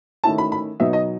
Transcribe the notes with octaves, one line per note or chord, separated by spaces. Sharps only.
D#3 A3 C#4 E4 A5
B5
B5
B2 F#3 B3 D#4 E5
D#5